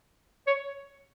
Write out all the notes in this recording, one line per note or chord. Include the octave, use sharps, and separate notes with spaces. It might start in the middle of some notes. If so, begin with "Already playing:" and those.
C#5